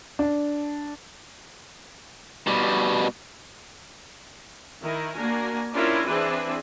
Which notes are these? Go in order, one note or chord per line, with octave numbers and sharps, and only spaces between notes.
D4
B2 G3
D#3 E4 A#4
A#3 D4 F#4 A#4 G#5
C#4 D4 E4 F4 A#4
E3 C4 D4 G#4 B4 E5